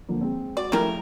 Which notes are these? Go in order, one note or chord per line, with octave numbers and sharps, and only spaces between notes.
D3 F3 A#3
G#3 C4
F#4 D5
C#3 F3 G3 A3 E4 A#4